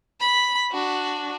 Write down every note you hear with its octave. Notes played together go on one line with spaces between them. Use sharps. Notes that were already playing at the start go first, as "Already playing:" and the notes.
B5
D4 F#4